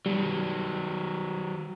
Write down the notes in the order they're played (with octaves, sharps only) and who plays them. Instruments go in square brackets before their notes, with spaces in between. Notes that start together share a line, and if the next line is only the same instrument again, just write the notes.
[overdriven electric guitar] D#3 F#3 [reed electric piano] G3